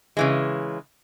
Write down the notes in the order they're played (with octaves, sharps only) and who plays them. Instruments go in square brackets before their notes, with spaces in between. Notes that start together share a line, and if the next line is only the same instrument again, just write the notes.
[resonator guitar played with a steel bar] C#3 E3 G#3